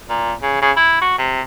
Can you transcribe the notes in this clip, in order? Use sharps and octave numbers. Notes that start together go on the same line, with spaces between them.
A#2
C#3
C#3
E4
F#4
C3